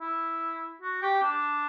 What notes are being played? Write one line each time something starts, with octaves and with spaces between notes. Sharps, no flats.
E4
F#4
G4
D4